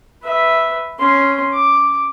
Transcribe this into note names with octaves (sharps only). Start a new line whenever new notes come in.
B4 E5
C#4 C6
D6